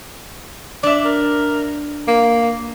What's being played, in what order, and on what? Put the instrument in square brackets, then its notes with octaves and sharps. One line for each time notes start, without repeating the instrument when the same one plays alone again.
[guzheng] D4 E5 [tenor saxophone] D5
[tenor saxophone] A#4
A#3